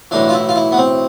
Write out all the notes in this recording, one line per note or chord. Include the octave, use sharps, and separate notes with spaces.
B1 A2 E3 D4
F4
E4
F4
E4
B3
C4